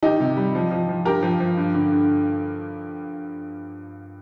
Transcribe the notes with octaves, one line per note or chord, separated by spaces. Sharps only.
D#3 D#4 G4
C3
G3
F3
F3
F3
G2 G4 A#4
F3
F3
G2
D3
G2